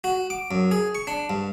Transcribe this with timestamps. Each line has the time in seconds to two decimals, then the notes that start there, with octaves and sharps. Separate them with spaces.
0.04 F#4
0.30 D6
0.51 F#2
0.71 G#4
0.95 C#6
1.07 D4
1.30 G2